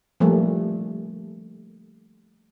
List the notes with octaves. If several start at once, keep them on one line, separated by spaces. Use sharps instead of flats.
F3 G3 A3 A#3